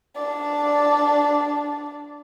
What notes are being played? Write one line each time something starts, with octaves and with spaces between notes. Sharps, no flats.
D4 D5